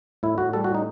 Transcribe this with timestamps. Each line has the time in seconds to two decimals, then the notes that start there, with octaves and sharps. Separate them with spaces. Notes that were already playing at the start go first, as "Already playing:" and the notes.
0.23 A2 E4
0.38 A2 F#4
0.53 G3 A4
0.64 F#4
0.69 A2
0.75 D#4